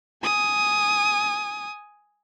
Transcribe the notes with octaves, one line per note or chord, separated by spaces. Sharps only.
G#5 D#6